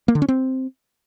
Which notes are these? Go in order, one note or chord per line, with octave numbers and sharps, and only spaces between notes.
A#3
D3
C#4
C4